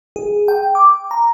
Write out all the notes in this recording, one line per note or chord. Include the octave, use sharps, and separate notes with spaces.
G#4
G5
D6
A#5